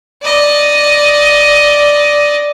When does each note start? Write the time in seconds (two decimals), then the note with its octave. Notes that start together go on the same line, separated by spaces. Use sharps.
0.22 D5 D#5